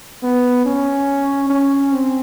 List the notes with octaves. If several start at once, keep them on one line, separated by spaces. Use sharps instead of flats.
B3
C#4
C#4
C4